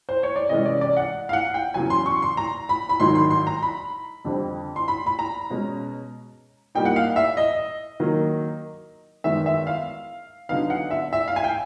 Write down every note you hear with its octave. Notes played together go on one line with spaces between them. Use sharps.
C5
C#5
D5
C3 E3 G#3 C#4 D#5
D5
D5
F#5
F5
F#5
G5
E2 C#3 F#3 G#5
C6
C#6
C6
A#5
B5
B5
G#2 D#3 F#3 C6
C6
C6
A#5
B5
F2 D3 G3 C4
C6
B5
B5
A#5
B2 G#3 C#4
A#2 G3 A#3 D#4 G5
F#5
F5
E5
D#5
D#3 F#3 A#3
F#2 D#3 G#3 B3 E5
E5
F5
D3 F#3 B3 D#4 F5
F#5
E5
E5
F5
G#5
G5